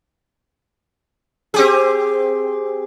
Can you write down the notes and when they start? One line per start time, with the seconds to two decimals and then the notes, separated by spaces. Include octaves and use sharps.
1.54 C4 G4 G#4